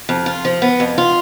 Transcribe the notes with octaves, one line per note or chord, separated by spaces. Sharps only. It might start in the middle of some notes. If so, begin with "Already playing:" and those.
F2
F4
F3
B3
F2
F4